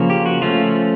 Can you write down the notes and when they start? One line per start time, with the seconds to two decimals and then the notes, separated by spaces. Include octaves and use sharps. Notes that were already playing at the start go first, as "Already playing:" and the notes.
Already playing: C#3 F3 A#3 C#4
0.10 G4
0.26 F#4
0.41 F3 A3 C#4 F4